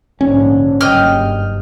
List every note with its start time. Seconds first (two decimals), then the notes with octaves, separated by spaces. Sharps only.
0.21 A#1 G#2 D3 C#4
0.81 F#1 G2 G3 D#5 G5 F6